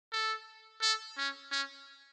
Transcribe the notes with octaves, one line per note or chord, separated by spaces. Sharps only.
A4
A4
C#4
C#4